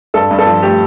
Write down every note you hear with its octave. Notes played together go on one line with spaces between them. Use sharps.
G2 A4
G2
A4
F3
A3 G4